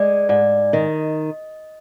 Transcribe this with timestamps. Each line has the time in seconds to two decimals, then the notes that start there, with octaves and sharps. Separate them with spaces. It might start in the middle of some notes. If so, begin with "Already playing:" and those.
Already playing: G#3 D5
0.29 G#2 D5
0.73 D#3 D#5